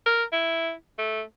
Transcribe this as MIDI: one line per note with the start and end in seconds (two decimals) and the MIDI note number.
0.06 0.24 70
0.33 0.73 64
0.98 1.23 57